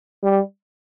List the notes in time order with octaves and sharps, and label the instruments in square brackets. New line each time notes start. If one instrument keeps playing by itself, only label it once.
[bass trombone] G3